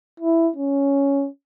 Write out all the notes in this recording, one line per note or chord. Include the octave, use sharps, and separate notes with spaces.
E4
C#4